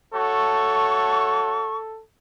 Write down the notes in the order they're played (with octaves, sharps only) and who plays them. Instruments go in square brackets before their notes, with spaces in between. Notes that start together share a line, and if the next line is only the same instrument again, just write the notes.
[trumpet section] A3 F#4 C#5 [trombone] A4 [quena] C#6